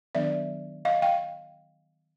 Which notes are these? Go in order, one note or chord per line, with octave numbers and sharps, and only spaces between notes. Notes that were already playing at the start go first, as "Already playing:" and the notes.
D#3 F#3 B3 D4 D5 E5
D#5 F5
F5 G5